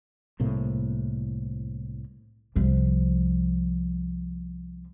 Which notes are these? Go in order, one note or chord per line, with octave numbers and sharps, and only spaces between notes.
C2 A2 C3 A#3
C2 F3